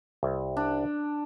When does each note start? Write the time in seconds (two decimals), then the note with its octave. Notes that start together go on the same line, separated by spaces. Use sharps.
0.23 C2
0.57 D4